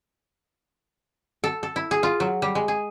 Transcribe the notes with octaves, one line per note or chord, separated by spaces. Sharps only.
A4
A4
E4
G#4
F4
F#3
G3
G#3
G#4